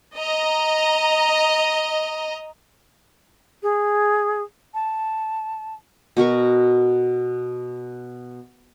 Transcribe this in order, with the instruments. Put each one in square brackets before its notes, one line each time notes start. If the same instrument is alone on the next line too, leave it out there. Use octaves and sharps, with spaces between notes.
[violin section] D#5 A#5
[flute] G#4
A5
[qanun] B2 F#4 A#4 C#6